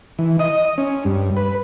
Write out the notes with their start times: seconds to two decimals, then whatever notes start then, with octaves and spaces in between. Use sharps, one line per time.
0.19 E3
0.39 D#5
0.78 C#4
1.05 G2
1.37 B4